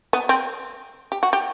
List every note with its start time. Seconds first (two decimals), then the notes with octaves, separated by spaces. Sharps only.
0.13 B3
0.29 C4
1.12 G4
1.23 F#4
1.33 G4